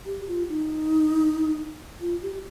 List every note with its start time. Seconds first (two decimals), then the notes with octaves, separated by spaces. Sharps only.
0.06 G4
0.28 F4
0.49 D#4
2.01 F4
2.22 G4